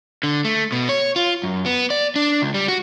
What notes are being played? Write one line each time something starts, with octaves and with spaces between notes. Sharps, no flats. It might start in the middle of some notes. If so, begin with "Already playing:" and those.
D3
A3
B2
C#5
F4
F#2
B3
D5
D4
C#2
G3
F#4